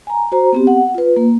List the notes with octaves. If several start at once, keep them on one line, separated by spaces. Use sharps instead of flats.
G#5 A#5
F#4 C5 A#5
B3 C4 G4
F#5
F4 B4
A#3